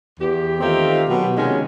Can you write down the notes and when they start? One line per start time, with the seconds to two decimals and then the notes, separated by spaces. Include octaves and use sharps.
0.20 E2 G4
0.61 D#3 A3 C4 D#4 F4 G4
1.09 B2 F#3
1.37 C3 D#3 F3 G#3 C#4